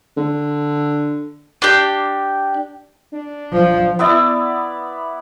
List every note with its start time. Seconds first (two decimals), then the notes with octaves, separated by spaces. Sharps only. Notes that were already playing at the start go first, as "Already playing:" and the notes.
0.17 D3
1.62 D4 G4
3.13 D4
3.53 F3
3.99 B3 E4 D5 E5